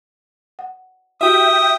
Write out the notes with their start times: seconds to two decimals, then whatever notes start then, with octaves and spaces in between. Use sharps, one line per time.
0.59 F#5
1.21 E4 F#4 G4 E5 G5 D#6